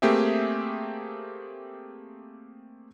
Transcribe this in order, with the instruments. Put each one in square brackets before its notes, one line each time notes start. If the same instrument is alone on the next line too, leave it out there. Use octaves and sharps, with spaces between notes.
[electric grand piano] A3 A#3 C4 G4 G#4 E5